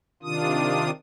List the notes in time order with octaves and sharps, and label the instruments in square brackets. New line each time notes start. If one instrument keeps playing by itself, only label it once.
[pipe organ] C3 D#3 D4 F4 D#6